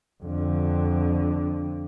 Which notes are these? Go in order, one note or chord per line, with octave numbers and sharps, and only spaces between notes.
F2 D3